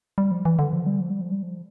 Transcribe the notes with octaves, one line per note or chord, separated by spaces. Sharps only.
G3
F3
E3
D3
F3
G3
F3
G3
F3
G3
F3